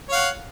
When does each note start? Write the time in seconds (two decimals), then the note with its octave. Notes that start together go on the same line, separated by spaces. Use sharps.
0.09 C#5
0.12 F5
0.15 F#5